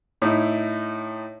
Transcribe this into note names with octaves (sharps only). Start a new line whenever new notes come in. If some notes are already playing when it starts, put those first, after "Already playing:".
A2 D#4 E4